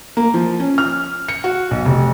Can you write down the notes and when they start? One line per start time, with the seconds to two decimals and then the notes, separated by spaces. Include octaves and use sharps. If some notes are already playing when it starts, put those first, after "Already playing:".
0.17 A#3
0.34 F3
0.60 C#4
0.78 F6
1.28 C#7
1.44 F#4
1.71 B1
1.85 F1